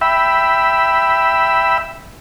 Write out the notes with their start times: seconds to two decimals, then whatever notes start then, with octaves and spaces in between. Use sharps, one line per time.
0.01 E5 G5 B5 E6